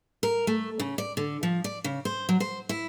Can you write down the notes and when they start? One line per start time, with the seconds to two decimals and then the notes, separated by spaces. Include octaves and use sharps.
0.23 A#4
0.47 A3
0.80 C#3
0.98 D5
1.17 D3
1.43 F3
1.64 D5
1.84 C#3
2.05 C5
2.29 F#3
2.40 C5
2.69 E4